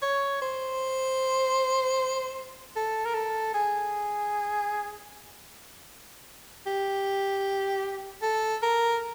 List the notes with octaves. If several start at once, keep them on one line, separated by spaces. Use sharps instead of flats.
C#5
C5
A4
A#4
A4
G#4
G4
A4
A#4